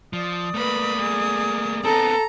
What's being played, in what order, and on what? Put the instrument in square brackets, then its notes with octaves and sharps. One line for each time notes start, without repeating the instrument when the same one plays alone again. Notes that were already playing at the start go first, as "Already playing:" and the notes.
[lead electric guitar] F3 [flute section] D5 D#6
[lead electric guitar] A3 A#3 [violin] B4 B5
[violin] G#4
[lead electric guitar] B3 C4 [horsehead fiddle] A4 [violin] A#5